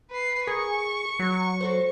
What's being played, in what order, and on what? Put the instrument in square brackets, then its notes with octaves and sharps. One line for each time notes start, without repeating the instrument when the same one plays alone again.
[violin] B4 C7
[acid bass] G#4 [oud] A#4 [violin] C#6
[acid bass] F#3
[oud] F#4 A4 C5